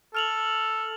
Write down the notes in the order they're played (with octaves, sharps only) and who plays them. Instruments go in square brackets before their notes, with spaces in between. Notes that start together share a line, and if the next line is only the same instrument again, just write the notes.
[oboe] A4 [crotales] F6 F7 F#7